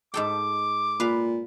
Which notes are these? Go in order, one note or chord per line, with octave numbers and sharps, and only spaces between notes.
G#2 A4 G5 D6
A#2 B4 F5